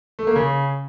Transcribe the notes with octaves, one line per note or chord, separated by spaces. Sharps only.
A3
A#3
C#3